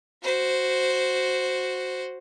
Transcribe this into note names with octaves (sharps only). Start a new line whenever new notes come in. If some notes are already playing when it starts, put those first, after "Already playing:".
F#4 C5